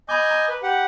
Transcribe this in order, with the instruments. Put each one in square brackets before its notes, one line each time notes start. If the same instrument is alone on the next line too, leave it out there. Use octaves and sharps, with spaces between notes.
[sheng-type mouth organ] D#5 G#5 G6 [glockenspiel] B5 D6
[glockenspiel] A#5
[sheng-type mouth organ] B4
G4 F#5